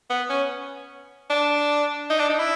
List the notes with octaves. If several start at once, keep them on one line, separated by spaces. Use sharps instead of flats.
B3
C#4
D4
D#4
D4
D#4
E4